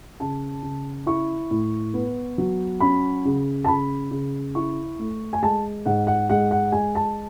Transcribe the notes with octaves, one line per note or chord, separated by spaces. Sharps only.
C#3 A5
C#3
E4 C#6
A2
B3
F#3
C#4 B5
C#3
A5
C#3 B5
C#3
E4 C#6
A3
G#5
G#3 A5
G#2 F#5
F#5
G#3 F#5
F#5
G#3 G#5
A5